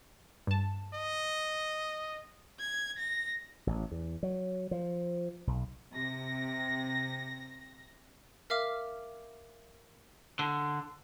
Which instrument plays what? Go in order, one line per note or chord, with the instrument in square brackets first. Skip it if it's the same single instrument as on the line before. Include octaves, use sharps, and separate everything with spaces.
[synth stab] G2 A5
[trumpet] D#5
[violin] G#6
A#6
[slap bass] A1
E2
F#3
F3
B1
[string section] C3 A#6
[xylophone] A#4 E5 F5 D6 F6
[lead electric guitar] D3